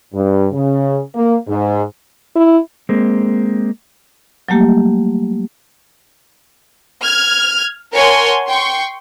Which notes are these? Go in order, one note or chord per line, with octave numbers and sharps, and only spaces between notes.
G2
C#3
A#3
G#2
E4
G#3 A#3 C4
F#3 G3 A3 A#3 G4
F6 G#6
A#4 C#5 F#5 G#5 A5 C6
G5 C6 C#6